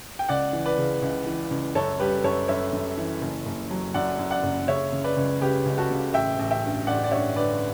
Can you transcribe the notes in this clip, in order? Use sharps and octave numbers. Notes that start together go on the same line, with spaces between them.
G5
C#2 D5 F#5
E3
B4 D5
C#3
C#2
E3
C#2
F#2 A4 C#5
G3 G4 B4
F#2 A4 C#5
F#2 C#5 E5
F#2
E3
F#1
F#1
F#3
F#2 D5 F#5
F#2
D5 F#5
F#1
C#3 C#5 E5
C#3
B4 D5
C#2
C#3 G4 B4
C#2
F#4 A4
C#3
A1 E5 G5
A1
E5 G5
G2
A1 D5 F#5
D5
G2 C#5 E5
D3 B4 D5